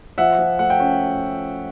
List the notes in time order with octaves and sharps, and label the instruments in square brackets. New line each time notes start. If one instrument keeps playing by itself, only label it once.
[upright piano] F3 E5 F#5
F3
A3 F#5
G5
C#4